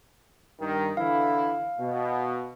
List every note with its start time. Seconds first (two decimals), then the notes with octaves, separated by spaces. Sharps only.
0.60 G2 D#3
0.97 D3 E3 E4 F5
1.79 B2